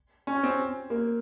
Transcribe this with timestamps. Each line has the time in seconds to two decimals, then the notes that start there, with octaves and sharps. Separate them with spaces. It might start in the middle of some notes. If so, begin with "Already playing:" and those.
0.27 C#4
0.43 C4
0.90 A#3